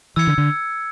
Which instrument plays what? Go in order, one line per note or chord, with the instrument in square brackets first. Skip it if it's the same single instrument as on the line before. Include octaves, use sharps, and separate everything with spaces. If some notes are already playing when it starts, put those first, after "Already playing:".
[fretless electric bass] E3 [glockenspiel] E6 G#6 C#7
[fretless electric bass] D3
D3